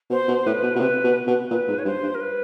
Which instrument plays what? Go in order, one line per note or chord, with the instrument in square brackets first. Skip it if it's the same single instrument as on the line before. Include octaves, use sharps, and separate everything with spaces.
[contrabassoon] B2 [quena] C5
[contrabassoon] B2
[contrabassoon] A2 [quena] B4
[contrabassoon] B2
B2
[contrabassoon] C3 [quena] B4
[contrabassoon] B2
B2
[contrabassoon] A#2 [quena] B4
[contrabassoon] G#2
[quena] C#5
[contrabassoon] G2 [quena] C5
[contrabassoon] G2
[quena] A#4
B4